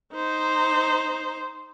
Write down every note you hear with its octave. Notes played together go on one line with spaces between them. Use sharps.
D#4 C5